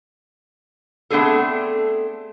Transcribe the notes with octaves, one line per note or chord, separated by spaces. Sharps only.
A3 B3 C4 D4 G#4 A4